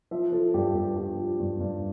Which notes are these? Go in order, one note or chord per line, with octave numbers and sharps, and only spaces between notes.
F3 E5
F3 A4
G2 G4
G2 G4
F3 G4
F3
G2
G2